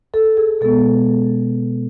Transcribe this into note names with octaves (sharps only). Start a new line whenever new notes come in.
A4
G#4
B2 G#3 B3 A4